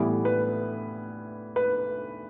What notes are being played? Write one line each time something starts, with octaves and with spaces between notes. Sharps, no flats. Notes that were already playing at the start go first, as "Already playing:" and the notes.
Already playing: A2 E3 G3 B3
B4
B4